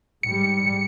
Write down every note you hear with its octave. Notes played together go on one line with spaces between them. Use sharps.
G#2 G3 C#7